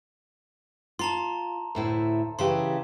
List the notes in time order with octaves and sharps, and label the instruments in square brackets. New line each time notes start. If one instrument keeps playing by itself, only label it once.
[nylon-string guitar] F4 [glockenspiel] A5 A#5 C6
[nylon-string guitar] D2 A2 E4
[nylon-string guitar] C#3 E3 G4 [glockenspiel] C6